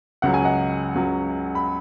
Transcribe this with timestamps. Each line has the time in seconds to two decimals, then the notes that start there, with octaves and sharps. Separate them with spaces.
0.22 C#2 C#3 F#3 F#5
0.34 G#5
0.44 D#5 F#5
0.95 C#2 C#3 F#3
1.55 B5